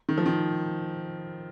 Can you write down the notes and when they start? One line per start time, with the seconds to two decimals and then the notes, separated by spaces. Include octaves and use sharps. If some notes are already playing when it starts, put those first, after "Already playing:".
0.09 D#3
0.18 F3
0.26 D#3